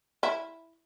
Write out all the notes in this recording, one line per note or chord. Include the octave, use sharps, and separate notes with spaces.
E4